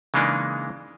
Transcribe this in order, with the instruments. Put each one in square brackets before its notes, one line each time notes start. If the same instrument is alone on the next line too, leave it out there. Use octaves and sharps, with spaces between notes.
[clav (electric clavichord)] C#3 E3 G#3 A#3 D4 D#4